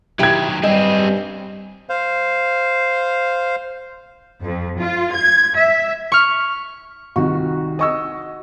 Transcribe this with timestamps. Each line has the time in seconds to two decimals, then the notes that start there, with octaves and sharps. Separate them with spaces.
0.19 D#3 F#3 E4 G4 G#6 D7
0.63 G2 G3 C4 G#4 D#5
1.89 C5 F5
4.42 F2
4.79 F4
5.12 G#6
5.56 E5
6.12 C#6 F6
7.16 C2 D#3 F#4
7.79 D#5 C#6 E6